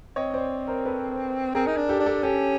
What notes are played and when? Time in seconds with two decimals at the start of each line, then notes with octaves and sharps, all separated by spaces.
0.16 C4 C#5 D#5
0.34 C5 D5
0.68 A#4 C5
0.85 A4 B4
1.55 C4 G#4 A#4
1.67 D#4
1.77 D4
1.89 G4 A4
2.00 D4
2.06 G4 A4
2.23 C#4 G4 A4